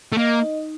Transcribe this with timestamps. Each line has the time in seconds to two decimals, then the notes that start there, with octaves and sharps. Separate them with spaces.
0.12 A3
0.18 A#3 D#5
0.41 D#4